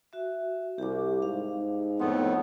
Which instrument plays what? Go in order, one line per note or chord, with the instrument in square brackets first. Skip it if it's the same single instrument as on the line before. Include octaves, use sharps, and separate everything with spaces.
[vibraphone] F#4 E5
[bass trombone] C2 [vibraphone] G4 D6
[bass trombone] G#2 [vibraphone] F5
[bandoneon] F2 A2 B3 [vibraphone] C6